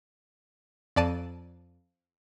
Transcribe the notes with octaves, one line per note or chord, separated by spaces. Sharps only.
F2 D5 A5 D#7